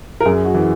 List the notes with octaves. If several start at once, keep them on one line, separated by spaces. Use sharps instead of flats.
A#4
F#2 G#4
F#4
E3